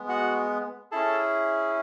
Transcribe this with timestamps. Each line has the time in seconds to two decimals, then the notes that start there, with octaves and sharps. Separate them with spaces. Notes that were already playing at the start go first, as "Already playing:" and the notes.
Already playing: G#3 B3
0.08 F#4 F#5
0.92 C#4 E4 G#4 A4 A5